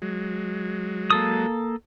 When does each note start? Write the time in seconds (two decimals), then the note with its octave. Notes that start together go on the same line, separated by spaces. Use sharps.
0.02 F#3 G#3
1.10 A#3 A4 D#6